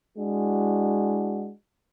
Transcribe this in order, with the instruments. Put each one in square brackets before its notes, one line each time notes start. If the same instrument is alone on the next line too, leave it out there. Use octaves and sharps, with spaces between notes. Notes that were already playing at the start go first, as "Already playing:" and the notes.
[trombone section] G#3 D4 E4 F#4